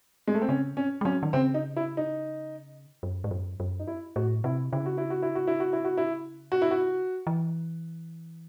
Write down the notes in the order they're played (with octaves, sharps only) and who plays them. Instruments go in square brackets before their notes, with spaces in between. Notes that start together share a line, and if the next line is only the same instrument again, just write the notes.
[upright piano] G#3
A3
C4
[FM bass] C#3 [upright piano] C#4
[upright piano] C#4
[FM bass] G#3
[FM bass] F#3 [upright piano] C#4
[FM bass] D#3
[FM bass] C#3 [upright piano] C4
[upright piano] D#4
E4
D#4
[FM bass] F#2
G#2
F#2
F#2
[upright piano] D#4
E4
[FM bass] A2 [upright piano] F#4
[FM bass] C3 [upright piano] E4
[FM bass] C#3 [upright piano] E4
[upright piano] F#4
E4
F#4
E4
F#4
E4
F#4
E4
F#4
E4
F#4
E4
F#4
[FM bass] E3